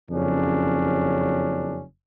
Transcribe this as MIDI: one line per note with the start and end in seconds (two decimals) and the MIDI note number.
0.10 1.83 30
0.10 1.83 41
0.10 1.83 49
0.10 1.83 61
0.10 1.83 62